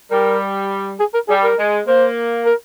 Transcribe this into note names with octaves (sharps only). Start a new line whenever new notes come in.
G3 A#4
G#4
A#4
G3 G#4
A#4
G#3
A#3 C5
A#4